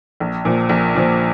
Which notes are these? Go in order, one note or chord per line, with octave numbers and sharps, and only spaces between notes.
A#1
A#2 F3
A#1
A#2 F3